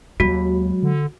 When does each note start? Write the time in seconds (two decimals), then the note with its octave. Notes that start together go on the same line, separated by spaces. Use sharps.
0.20 D#2 F#3 G#3 F#4
0.83 D3